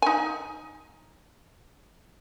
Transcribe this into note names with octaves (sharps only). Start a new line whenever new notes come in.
D#4 G#5